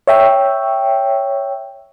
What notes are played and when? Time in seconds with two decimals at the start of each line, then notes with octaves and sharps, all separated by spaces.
0.07 C#5 E5 G5